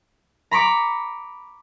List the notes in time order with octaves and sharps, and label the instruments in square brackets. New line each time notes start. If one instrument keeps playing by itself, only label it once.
[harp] A#5 B5 C#6 D6